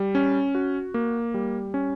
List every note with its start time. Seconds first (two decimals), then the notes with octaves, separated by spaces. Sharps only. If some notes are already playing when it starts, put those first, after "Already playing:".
Already playing: G3
0.15 C#4
0.55 F#4
0.94 A#3
1.34 G3
1.74 C#4